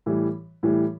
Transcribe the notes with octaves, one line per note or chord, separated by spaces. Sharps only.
A2 E3 G3
A2 E3 G3